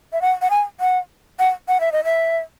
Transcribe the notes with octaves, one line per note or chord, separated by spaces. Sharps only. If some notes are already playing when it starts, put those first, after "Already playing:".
E5
F#5
F#5
G#5
F#5
F#5
F#5
E5
D#5
E5